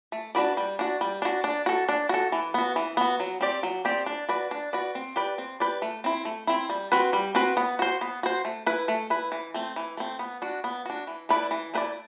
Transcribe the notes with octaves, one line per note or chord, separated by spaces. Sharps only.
A3
D4 F#4 B4 D5
G3
D4 F#4
G3
D4 F#4
D4
F#4 A4
D4
F#4 A4
E3
B3 F#4
E3
B3 F#4
F#3
C4 G4 D5
F#3
C4 G4 D5
D4
F#4 B4 D5
D4
F#4 B4 D5
C4
G4 B4 D5
C4
G4 B4 D5
A3
C4 E4
A3
C4 E4
G3
C4 F#4 B4
G3
C4 F#4 B4
B3
F#4 C5
B3
F#4 C5
A3
E4 B4
A3
E4 B4
E3
A3 C4
E3
A3 C4
B3
D4 F#4
B3
D4 F#4
E3
A3 E4 B4 D5
E3
A3 E4 B4 D5